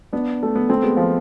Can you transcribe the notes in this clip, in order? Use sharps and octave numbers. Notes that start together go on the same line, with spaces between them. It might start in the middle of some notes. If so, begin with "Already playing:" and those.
B3 D4
A3
B3
A3 C4
G#3 B3
F3